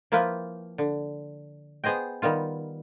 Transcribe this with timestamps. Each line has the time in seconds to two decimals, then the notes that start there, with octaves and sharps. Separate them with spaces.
0.12 F3 A#3 E4 F4 B4 G5
0.78 D3
1.84 B3 G#4 C5 D#5 G5
2.22 D#3 G3 B3 F4